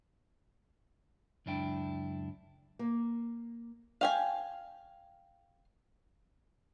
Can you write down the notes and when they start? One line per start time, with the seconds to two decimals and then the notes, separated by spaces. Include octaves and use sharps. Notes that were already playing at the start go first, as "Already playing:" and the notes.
1.46 C#2 F#2 D4 E4 G5
2.79 A#3
4.01 F5 G5 G#5